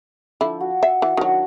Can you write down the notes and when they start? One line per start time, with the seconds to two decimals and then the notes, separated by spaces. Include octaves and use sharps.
0.41 D3 F3 E4
0.60 F#4
0.83 E5
1.02 E3
1.17 D#3 F#3 D4 E4 F#4